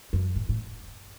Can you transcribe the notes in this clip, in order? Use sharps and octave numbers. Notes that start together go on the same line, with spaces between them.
F#2
A2
A2